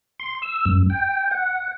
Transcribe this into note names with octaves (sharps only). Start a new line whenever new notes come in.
C6
E6
F#2
G5
F#5